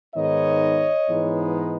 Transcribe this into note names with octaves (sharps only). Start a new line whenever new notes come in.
G#2 D#3 G#3 B3 D#4 C#5 D#5
G#2 E3 G#3 B3 D#4